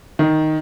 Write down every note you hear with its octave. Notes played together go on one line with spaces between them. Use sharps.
D#3